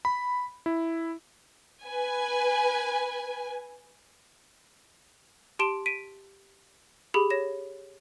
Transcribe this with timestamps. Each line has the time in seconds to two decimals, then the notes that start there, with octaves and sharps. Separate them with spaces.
0.05 B5
0.66 E4
1.84 B4 G#5
5.59 G4 A5 C6 D7 E7
5.86 B6 D7 D#7
7.14 G4 G#4 B5
7.30 C#5 A#6 E7